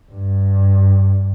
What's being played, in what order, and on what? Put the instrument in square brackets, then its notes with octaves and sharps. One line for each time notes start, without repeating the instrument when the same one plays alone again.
[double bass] G2